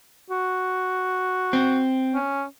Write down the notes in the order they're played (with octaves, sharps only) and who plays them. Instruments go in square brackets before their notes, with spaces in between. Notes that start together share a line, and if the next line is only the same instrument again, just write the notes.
[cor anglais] F#4
[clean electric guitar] C4
[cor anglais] C#4